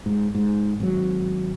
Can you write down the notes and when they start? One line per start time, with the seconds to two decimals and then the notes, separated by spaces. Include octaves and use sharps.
0.06 G#2
0.35 G#2
0.80 G#1 F#3